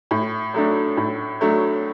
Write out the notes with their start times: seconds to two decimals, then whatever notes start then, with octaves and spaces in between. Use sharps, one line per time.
0.11 A2
0.54 F#3 A3 D4
0.97 A2
1.41 F#3 A3 D4